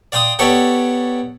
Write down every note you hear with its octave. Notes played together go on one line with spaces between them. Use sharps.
D5 F5 G5 C6 D#6
B3 G4 A4 C#5 D5 G5